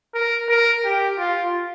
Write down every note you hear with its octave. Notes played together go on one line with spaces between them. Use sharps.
A#4
A#4
G4
F4